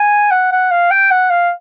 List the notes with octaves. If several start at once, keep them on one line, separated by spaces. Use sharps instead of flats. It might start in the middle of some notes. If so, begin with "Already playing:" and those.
Already playing: G#5
F#5
F#5
F5
G5
F#5
F5